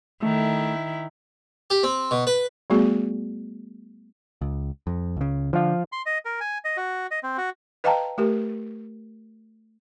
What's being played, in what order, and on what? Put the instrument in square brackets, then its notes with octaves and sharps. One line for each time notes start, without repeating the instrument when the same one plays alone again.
[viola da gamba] D#3 E4 [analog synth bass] A3
[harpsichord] G4
C4
B2
B4
[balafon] G3 A3 B3 F#4 G#4
[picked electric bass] C#2
F2
C#2 C#3
[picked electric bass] D3 [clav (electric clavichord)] F3 F4
[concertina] C6
D#5
A#4
G#5
D#5
F#4
D#5
C4
F#4
[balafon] B4 D#5 F5 G5 A5 A#5
A3 G4 A#4